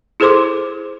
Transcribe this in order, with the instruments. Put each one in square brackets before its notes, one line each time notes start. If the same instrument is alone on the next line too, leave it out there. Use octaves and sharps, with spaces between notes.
[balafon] E4 G#4 A4 C5 C6 D6